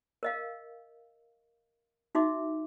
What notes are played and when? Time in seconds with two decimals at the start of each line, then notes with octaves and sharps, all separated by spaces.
0.23 A#4 D#5 F5
2.15 D#4 F#4 E5 D6